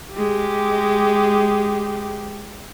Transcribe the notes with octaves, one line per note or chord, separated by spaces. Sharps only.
G#3 G4